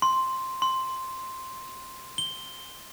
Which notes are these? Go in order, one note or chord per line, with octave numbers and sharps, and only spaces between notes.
C6
C6
G7